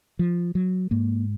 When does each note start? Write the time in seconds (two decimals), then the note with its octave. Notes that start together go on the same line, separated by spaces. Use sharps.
0.19 F3
0.55 F#3
0.91 G#2 A#3